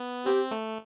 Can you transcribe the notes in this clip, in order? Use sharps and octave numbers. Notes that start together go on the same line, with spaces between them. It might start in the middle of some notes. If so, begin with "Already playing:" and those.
Already playing: B3
C4 G4
A3